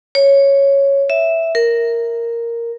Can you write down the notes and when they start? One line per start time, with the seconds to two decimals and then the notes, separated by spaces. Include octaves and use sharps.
0.15 C#5
1.10 E5
1.55 A#4